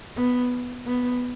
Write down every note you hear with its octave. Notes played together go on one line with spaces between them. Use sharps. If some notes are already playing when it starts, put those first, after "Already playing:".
B3
B3